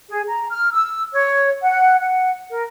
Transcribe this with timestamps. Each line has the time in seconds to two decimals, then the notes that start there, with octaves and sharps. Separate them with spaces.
0.09 G#4
0.28 A#5
0.51 F6
0.72 E6
1.13 C#5
1.62 F#5
2.00 F#5
2.50 A#4